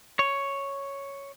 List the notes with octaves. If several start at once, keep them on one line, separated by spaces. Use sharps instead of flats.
C#5